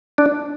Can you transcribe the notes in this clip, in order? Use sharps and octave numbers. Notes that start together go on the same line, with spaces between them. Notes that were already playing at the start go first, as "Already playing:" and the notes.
D4